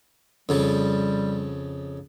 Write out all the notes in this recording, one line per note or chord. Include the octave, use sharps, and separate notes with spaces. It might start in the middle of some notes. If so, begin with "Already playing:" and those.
F2 C#3 F3 G3